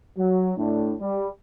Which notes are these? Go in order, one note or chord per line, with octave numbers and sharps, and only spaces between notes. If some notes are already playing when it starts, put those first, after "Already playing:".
F#3
A2 D4
G3